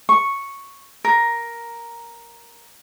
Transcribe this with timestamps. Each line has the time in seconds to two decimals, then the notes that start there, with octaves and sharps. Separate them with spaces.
0.09 C#6
1.04 A#4